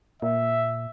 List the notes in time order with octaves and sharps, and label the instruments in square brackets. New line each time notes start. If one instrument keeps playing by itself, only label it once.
[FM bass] A#2 [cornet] E5